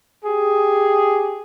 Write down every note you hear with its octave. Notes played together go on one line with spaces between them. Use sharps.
G4 G#4